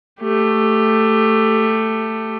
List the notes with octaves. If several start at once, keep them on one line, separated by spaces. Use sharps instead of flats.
A3 G4